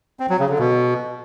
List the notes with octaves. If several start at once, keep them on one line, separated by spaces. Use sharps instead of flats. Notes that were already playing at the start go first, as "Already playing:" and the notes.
C4
F#3
C#3
D3
B2